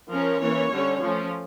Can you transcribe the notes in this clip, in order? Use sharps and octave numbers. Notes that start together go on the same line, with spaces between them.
F3 C#4 A#4
E3 A#3 C#4 C#5
D3 G3 C#4
F3 A3 C#4